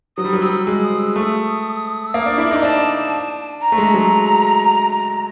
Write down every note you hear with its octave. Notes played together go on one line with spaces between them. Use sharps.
F#3 D#6
G3
F#3
G3 E6
G#3
D#6
E6
A3 D#6
E6
A#3 D#6
D4
E4 D6
D#4
A#5
D4 A5
A#5
A3
G#3
F#3